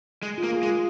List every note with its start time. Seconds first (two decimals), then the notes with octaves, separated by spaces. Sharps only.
0.22 G#3 G#4
0.38 F4
0.43 A#3
0.53 G#4
0.63 G#3
0.67 F4